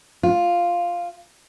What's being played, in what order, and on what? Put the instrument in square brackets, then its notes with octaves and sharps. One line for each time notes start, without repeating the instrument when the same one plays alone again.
[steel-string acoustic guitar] F4